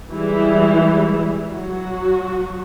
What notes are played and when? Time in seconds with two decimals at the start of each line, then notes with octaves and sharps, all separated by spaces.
0.11 E3 G3 G#3 E4
1.50 F#3 F#4